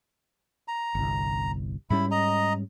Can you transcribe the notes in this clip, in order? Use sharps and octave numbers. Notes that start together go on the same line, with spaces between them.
A#5
G1 C2
G#2 G3 C#4 E4 B5
D#5 A#5